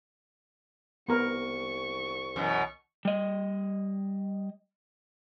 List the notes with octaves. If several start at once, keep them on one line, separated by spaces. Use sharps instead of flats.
C2 B3 A#4 C#6
F#2 B2 E3
G3 D#5